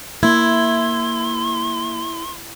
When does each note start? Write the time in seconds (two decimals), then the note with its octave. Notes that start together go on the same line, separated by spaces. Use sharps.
0.23 A#3 E4 C6 G#6